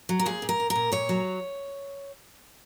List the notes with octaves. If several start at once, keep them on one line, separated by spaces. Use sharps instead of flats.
F#3
A#4
A#2 G#4
A#2
A#4
A#2
A#4
A#2
A#2 C#5
F#3